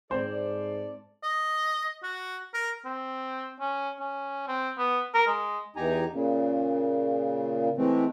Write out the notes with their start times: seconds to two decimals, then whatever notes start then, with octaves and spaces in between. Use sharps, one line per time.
0.11 G#2 C4 A4 C5 D5
1.23 D#5
2.03 F#4
2.54 A#4
2.85 C4
3.60 C#4
3.99 C#4
4.48 C4
4.78 B3
5.14 A#4
5.27 G#3
5.76 E2 D#4 G4 G#5 A#5
6.13 A#2 C#3
7.78 E3 G#3 A3 C4